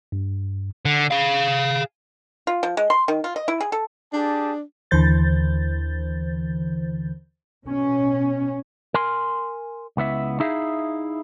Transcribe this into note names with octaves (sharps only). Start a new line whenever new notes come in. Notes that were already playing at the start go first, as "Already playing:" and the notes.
G2
D3
G#4 F5
F4
F3
G#3
C6
D#3
F4
D#5
E4
G#4
A4
D4 G4 G#4 A5
D#2 D3 E3 C5 G6 A6
B2 C#4
A#4 G#5 C6
C#2 B3 E4 E5
D#4 E4 G#4 E5 F5